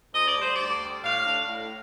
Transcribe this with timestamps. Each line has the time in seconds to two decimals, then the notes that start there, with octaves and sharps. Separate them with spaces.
0.15 D2 D#5
0.28 D5
0.37 D3 G3 C5
0.54 D2 D5
0.82 D3 G3
1.04 A2 F5
1.26 A3 D4
1.48 A2